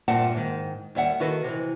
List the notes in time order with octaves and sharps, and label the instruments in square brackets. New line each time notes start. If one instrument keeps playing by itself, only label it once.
[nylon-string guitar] G2 A#2 C4 E5 F#5 A5
G#2 D#3
D#2 G3 E5 F#5
D#3 E4 F#4 A4 B4
C3 E3